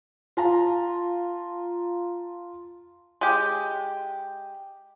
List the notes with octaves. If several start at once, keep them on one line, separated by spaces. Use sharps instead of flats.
F4 A5 A#5
G#3 G4